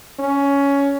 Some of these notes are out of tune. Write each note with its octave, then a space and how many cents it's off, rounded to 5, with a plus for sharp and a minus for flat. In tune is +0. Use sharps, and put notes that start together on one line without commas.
C#4 +15